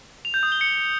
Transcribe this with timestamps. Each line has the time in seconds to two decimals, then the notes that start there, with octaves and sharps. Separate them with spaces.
0.25 F7
0.34 G6
0.43 D#6
0.52 G7
0.61 C#7